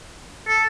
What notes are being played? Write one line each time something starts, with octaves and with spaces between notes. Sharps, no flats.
A4